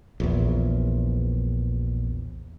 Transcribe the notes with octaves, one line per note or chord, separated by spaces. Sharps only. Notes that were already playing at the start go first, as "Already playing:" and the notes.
A#1 E2